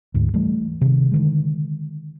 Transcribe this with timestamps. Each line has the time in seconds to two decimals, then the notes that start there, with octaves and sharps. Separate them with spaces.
0.14 D2 G#2
0.34 E3 G3 A3
0.81 C3 D#3
1.12 D3 D#3 G#3